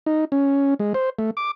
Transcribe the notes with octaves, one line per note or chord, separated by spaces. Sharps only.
D#4
C#4
G#3
C5
A3
D6